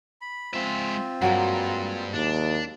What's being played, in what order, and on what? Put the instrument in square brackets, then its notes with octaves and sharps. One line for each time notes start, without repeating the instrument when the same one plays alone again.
[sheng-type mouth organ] B5
[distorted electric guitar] G#3 E5 [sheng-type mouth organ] C4 F4
[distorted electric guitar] G2 [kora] F#3 G#3 A#3
[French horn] D#2 [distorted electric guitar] D4